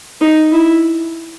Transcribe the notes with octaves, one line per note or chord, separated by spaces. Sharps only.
D#4
E4